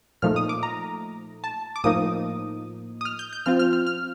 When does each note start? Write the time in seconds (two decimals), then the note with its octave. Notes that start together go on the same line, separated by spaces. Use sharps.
0.22 A#2 F3 A3 D#4 F6
0.36 D#6
0.49 D6
0.63 A#5
1.44 A5
1.76 D6
1.84 A2 F3 A#3 D#4 D#6
3.01 D#6
3.05 F6
3.19 G6
3.33 G6
3.46 F3 C4 F4 F6
3.59 F6
3.73 F6
3.87 F6